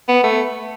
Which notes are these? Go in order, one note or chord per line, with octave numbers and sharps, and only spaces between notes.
B3
A3